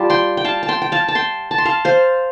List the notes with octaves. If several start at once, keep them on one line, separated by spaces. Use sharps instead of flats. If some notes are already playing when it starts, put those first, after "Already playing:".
Already playing: G3 F4 F5 A5
G5 C6
G5
F5 A5
A5
G5 C6
G5
F5 A5
A5
G5 C6
A5
C6
F5 A5
C5 F5